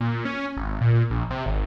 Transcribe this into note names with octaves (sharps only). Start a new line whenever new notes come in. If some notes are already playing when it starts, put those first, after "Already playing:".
A#2
C#4
G#1
A#2
A#1
C3
G#1